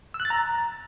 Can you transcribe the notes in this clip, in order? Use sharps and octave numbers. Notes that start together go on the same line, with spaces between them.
E6
F#6
A6
A#5